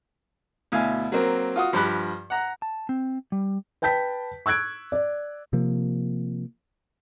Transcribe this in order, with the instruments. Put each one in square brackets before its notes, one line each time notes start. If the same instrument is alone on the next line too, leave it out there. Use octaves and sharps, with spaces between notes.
[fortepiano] D2 B2 E4 F5 G#5
F#3 A#3 C4 A#4
F4 F#4 D#6
G2 F3 G4 B5 F#6
F#5 A#5
[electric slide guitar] A5
C4
G3
[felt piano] B4 G5 A5 G6 B6
C#6 E6 F#6 G#6 D7
D5
[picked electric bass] C3 F3 A#3